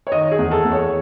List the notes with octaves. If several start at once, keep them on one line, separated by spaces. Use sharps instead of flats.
C#5
D#3 D#5
G#4
E2
A4
E2
C#5